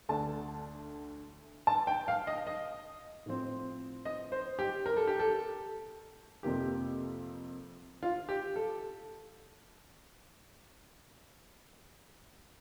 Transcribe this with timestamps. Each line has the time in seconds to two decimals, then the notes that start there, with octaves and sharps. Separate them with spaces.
0.09 D2 D3 A3 D4 A5
1.67 A5
1.87 G5
2.08 F5
2.27 D#5
2.47 D#5
3.26 A2 F3 C4
4.05 D#5
4.32 C5
4.59 G4
4.86 A#4
4.97 A4
5.07 G4
5.19 A4
6.43 F2 C3 F3 A#3 G4
8.03 F4
8.29 G4
8.56 A4